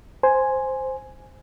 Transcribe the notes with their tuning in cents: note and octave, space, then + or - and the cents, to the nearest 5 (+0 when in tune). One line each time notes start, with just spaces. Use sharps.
C5 +0 G#5 +0